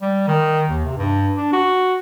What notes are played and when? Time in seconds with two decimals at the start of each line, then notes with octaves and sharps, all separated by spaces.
0.02 G3
0.28 D#3
0.69 D#2
0.85 C3
0.98 G2
1.37 D4
1.53 F#4